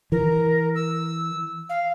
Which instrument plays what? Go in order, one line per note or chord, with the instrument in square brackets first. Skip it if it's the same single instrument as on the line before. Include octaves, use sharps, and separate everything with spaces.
[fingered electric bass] E3 [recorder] A#4
[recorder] E6
F5